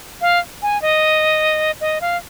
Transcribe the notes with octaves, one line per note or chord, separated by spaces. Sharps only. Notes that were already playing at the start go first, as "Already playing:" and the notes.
F5
G#5
D#5
D#5
F5